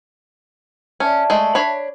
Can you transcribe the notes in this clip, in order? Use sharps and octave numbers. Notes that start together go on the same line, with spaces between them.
C#4 D5 E5 A5
G#3 A3
D4 C#5 B5